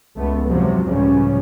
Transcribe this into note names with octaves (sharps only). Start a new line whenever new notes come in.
C#2 A3 B3
E2 G#2 C3 F3 F#3
C#2 A2 C#3 F3 G3 C#4